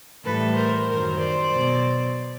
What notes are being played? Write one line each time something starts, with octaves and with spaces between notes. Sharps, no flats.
A2 E3 G3 A4 B4
A#4 C5
F#2 D#3 F#3 A#4 C5
C5 D5
B2 F#3